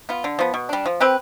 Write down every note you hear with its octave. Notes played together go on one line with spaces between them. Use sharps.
B3 F4
D3
F3 B3
B2
G3 D4
F3
C4 G4 B4